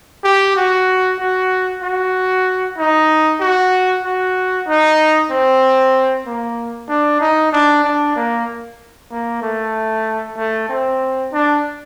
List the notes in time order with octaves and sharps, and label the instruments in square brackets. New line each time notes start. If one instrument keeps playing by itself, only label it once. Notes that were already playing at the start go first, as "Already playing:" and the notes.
[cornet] G4
F#4
F#4
F#4
D#4
F#4
F#4
D#4
C4
A#3
D4
D#4
D4
D4
A#3
A#3
A3
A3
C4
D4